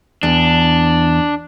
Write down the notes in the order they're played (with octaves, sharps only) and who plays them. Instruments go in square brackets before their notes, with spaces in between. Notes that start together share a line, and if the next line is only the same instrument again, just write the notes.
[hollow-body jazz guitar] E2 [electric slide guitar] D4